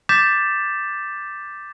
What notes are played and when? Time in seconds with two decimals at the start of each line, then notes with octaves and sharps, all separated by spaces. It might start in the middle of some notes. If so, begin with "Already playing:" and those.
0.09 D6 G6 A6 B6 E7